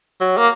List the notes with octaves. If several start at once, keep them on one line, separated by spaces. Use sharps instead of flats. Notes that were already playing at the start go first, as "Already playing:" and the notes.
F#3
A#3